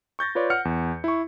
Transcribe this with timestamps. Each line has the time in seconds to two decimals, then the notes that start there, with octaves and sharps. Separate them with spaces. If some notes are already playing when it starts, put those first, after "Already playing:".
0.19 C#6 G6 A6 A#6
0.35 F4 B4 C#5 D5
0.50 F#5 F6 C#7
0.65 E2
1.04 E4 C#6